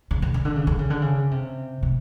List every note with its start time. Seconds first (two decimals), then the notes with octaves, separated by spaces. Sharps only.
0.11 C#3
0.22 D3
0.34 C#3
0.45 D3
0.56 C#3
0.67 D3
0.79 C#3
0.90 D3
1.02 C#3
1.31 C3
1.83 C3